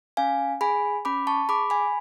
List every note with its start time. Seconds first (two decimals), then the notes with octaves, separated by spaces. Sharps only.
0.17 C#4 F5 G#5
0.61 G#4 G#5 B5
1.05 C#4 B5 D6
1.27 A5 C#6
1.49 G#4 B5 D6
1.70 G#5 B5